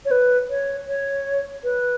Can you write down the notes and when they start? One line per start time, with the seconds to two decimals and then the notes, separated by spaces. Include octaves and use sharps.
0.05 C#5
0.11 B4
0.50 C#5
0.88 C#5
1.64 B4